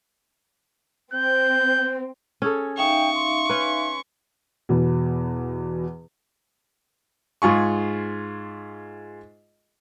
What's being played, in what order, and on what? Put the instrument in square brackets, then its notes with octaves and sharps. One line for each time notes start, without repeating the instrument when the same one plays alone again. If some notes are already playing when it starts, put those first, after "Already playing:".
[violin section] C4 [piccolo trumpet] G6
[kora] C#4 G#4 A4
[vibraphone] D#4 E5 F5 [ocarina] G5 [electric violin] C#6
[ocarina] C6
[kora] C#4 B4
[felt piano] E2 B2
[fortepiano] G#2 F4 G#4 C#6